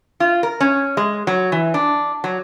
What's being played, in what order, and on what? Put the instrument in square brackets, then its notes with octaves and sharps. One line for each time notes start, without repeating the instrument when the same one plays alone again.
[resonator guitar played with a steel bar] F4
A#4
C#4
G#3
F#3
E3
D4
F#3